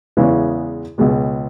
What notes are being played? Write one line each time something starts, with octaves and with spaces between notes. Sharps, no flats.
E2 C#3 E3 G#3 B3
C#2 B2 G#3